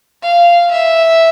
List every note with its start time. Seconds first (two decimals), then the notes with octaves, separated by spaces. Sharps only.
0.22 F5
0.71 E5